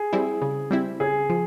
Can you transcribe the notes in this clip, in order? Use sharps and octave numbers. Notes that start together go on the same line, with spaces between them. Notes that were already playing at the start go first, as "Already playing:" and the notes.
Already playing: G#4
G3 C4 E4
C#3
G3 C4 E4
C#3 G#4
F3